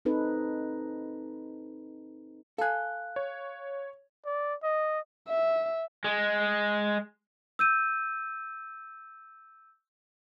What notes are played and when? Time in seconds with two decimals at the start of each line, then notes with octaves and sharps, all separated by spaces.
0.05 C4 D#4 A4 B4
2.58 A4 F5 G#5 F#6
3.16 C#5
4.25 D5
4.63 D#5
5.28 E5
6.05 G#3
7.59 E6 G6 D#7